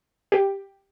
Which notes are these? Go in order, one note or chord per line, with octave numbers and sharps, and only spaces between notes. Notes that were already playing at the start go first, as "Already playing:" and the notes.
G4